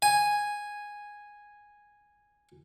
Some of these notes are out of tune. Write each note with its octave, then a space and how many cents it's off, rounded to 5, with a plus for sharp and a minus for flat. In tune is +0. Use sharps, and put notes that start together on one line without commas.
G#5 -5